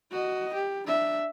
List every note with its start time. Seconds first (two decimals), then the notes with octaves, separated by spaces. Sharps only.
0.11 F#4 D#5
0.54 G4
0.87 D4 E5